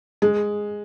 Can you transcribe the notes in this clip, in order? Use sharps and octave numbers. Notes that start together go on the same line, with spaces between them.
G#3